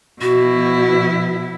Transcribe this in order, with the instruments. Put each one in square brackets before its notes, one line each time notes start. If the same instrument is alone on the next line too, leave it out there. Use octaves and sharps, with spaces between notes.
[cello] B2 E4 [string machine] F3 B3 [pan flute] F#4